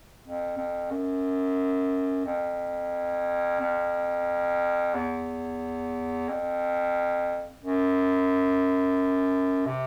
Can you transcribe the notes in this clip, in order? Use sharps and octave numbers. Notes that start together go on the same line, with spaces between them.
F2
F2
F#2
F2
F2
E2
F2
F#2
C3